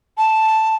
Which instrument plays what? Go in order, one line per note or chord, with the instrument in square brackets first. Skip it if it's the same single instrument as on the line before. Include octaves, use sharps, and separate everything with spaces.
[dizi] A5